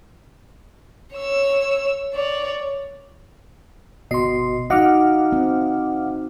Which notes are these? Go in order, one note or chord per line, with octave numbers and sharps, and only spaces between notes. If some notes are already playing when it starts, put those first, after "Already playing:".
C#5 E6
C#5 D5
G1 B2 D#5 C6 C7
D#4 F#4 D#5 F5 F#5 D6 F6
C4